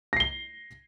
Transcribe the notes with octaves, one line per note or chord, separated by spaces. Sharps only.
A#6 C7 G7